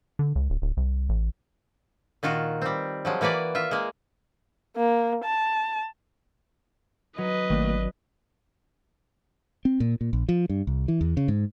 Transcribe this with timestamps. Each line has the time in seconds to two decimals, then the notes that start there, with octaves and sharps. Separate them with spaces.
0.19 D3
0.35 C#2
0.50 D1
0.62 D1
0.77 C2
1.09 A1
2.23 A#2 D#3 F4 F#4
2.62 G3 C4
3.05 F3 F#3 G#3
3.21 E3 A#3 F#4 B4 D5
3.55 F4 E5
3.71 G#3 A#3
4.77 A#3
5.24 A5
7.18 F#3 B4 D#5
7.50 G#1 D#3 A3 A#3 D4
9.65 C4
9.80 A#2
10.01 A#2
10.13 A#1
10.29 F3
10.49 G2
10.67 C2
10.88 E3
11.01 E2
11.17 C#3
11.28 G#2